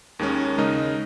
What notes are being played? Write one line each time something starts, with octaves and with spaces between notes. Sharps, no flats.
D#2 D#3 G#3 C#4
C#3 G#3 D#4 A#4 D#5